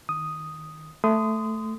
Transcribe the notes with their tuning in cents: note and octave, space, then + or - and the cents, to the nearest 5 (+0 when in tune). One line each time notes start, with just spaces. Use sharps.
D#3 +0 D#6 +0
A3 +0 C6 -30 D#6 +0